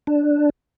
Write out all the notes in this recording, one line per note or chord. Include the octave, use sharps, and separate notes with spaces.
D4